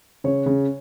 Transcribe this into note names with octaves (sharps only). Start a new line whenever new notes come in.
C#3 C#5
C#3